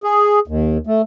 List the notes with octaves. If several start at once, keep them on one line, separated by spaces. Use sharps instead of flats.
G#4
D#2
A3